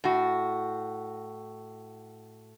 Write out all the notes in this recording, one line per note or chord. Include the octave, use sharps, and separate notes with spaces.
A2 F#4